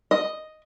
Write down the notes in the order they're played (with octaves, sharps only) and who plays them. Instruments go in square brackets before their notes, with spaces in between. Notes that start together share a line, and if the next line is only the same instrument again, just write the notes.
[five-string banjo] D#5